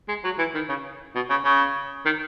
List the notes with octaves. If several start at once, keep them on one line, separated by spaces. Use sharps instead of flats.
G#3
F#3
E3
D#3
C#3
B2
C#3
C#3
D#3